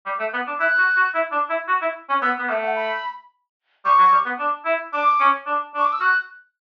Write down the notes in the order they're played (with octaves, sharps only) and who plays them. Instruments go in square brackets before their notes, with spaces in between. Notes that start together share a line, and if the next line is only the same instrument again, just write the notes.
[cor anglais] G3
A3
B3
D4
[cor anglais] E4 [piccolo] F#6
[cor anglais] F#4
F#4
E4
D4
E4
F#4
E4
C#4
[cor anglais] B3 [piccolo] E6
[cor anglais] B3
[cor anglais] A3 [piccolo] E5
[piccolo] F#5
B5
[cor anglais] G3 [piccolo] C#6
[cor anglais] F#3
G3
B3
D4
E4
[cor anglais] D4 [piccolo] D6
[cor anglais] C#4
D4
D4
[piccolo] C#6
D6
E6
[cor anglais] F#4 [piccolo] F#6